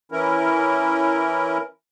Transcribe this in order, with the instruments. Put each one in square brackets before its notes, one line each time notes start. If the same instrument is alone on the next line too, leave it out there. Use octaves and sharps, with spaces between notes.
[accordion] E3 C#4 E4 A#4